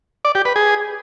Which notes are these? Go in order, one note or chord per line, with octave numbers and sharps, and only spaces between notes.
D5
G4
B4
G#4